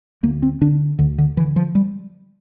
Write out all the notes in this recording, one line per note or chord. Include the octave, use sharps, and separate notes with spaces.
D2 A#3
C4
D3 D4
D2 D3
D3
D3 E3
F3
G3